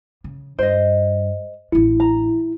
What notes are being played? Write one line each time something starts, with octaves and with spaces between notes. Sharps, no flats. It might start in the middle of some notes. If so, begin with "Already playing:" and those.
C#3
G2 C5 D#5
A1 D4 E4
A#5